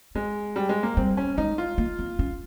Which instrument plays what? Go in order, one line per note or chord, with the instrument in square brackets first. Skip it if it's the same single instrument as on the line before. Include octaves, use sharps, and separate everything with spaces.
[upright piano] G#3 [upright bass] C4
[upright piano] G3
G#3
A#3
[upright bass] G3 [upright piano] C4
[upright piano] C#4
[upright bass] G#3 [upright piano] D#4
[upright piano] F4
[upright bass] A#3
C4
C#4